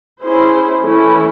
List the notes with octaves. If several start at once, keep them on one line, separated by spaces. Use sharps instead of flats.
C#4 E4 G#4 C5
E3 A3 C#4 E4